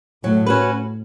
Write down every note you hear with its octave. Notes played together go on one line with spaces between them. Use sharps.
A2 F#3
C#4 F#4 B4